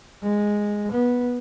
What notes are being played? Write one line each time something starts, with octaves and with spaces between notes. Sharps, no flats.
G#3
B3